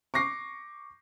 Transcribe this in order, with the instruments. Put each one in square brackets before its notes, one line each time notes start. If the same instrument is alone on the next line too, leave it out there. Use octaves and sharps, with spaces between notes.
[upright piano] C#6 D6 A#6 C7